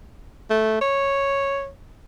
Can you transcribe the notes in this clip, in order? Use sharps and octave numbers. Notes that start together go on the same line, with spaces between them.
A3
C#5